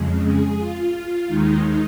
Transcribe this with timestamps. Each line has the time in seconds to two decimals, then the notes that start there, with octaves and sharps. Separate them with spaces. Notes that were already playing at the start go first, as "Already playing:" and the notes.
Already playing: F2 C#3 G#3
0.23 G#4
0.58 F4
1.27 D#2 D#3 G#3 D#4